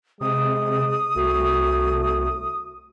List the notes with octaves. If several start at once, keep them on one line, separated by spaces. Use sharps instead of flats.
C3 G#3 D#6
C2 A3 F#4